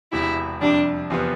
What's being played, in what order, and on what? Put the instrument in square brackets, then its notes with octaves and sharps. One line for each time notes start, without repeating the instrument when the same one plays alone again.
[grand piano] E1 E2 C3 [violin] E4
[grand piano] F2 C3 G3 [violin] D4
[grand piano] E2 C3 F3 B3